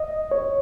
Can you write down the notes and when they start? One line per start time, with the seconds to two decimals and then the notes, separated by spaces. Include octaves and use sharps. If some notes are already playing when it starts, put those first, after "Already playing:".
Already playing: D#5
0.31 C#5